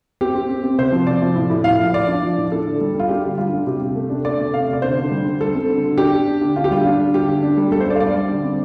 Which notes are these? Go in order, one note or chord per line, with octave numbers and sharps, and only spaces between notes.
C4 G4
C4
C4
C4
C3 C5
F3
C3 D5
F3
A2
A2
A2 F5
F3 F5
F3 D5
D4
F3
A2
D4 A4
D3
G3
G3
F4
D4 G4
D3
G3 F4
D4
C3 G4
C3
A3
D4
A3 D5
C3
C3 F5
C3
D5
D3 C5
D3
G3
D3
G3 A4
C4
D3
D3
D4 G4
D4
D4
D3
D3 F4
G4
G3 F4
D4
D3
D3 G4
D3
D4
G3
G3 A4
C5
D4 D5
F5
G3 D5
G3
D3
C4